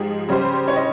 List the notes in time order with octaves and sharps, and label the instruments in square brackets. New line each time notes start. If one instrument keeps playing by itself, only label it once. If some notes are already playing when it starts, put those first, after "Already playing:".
Already playing: [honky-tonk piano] G#2 F3 G#3 [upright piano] G4
[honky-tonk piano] C#3 G3 C#4 G4 C5
[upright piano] C#5
D#5